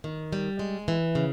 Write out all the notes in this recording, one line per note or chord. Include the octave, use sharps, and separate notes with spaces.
D#3
G3
G#3
E3
C#3